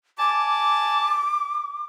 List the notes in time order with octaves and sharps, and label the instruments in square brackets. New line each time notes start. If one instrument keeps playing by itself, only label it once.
[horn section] D5 G#5 A5 [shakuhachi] D6